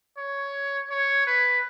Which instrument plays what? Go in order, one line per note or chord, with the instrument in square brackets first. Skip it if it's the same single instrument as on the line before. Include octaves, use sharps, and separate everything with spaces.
[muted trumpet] C#5
C#5
B4